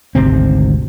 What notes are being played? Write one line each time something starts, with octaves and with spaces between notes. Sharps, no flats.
G#1 D2 C3 C4